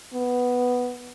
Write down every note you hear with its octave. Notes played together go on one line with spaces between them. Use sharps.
B3